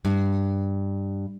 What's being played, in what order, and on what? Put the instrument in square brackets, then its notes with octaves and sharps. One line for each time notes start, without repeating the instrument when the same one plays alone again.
[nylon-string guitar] G2